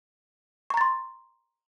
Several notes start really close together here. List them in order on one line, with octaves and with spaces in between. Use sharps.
C#6 A#5 A6 C6